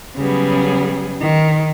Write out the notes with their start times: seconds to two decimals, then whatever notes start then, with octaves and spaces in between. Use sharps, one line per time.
0.16 C#3 F#3 G3 B3 G#4
1.20 D#3